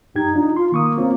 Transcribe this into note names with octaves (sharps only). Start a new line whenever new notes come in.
F#2 D#4 G4 G#6
D4 D#4 F4
F4 C6
D#3 A#3 C#6 D#6
C4 C#4 F4